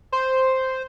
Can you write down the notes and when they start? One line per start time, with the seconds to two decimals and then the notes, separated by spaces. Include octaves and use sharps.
0.12 C5